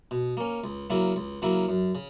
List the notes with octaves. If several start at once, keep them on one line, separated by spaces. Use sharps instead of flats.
B2
A#3 C#4
C#2
C#3 F#3 A#3 E4
C#2
C#3 F#3 A#3 E4
F#2
C#3